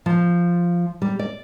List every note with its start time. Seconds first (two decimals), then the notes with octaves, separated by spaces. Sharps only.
0.06 F3
1.02 G3
1.19 D5